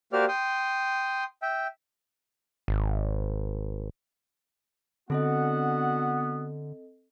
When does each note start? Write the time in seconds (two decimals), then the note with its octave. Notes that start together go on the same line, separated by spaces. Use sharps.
0.13 A#3 F#4 G4 C5 D5 F6
0.28 G5 C6 D#6
1.42 E5 G5
2.68 G#1
5.10 D3 B3 C4 D4 F#4 A4 D#5 F#5